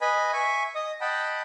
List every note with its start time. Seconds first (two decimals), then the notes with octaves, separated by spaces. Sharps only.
0.01 B4 D#5 G#5 B5
0.33 E5 G#5 C#6
0.75 D#5 D#6
1.01 D#5 F#5 G5 A5 B5